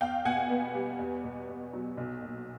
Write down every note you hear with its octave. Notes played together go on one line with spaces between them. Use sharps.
E2 F5 G5
B2 F#5 G#5
B3
G3
E2
B2
E2
F#3
B1
A#2